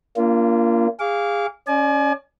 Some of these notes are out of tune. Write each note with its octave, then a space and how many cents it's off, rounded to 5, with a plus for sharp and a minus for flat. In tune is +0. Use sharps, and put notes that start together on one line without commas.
A#3 +0 D4 -40 F4 -30
G#4 -25 F5 +0 D6 -30
C#4 +0 D5 +30 G#5 +40